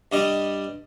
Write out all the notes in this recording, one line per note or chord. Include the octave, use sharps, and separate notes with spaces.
G2 G3 D#5